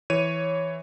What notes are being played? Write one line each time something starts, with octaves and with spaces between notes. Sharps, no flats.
E3 C#5 D#7